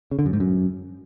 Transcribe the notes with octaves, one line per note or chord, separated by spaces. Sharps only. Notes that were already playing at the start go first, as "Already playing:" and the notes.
C#3
D3
F#2
G#2
F#2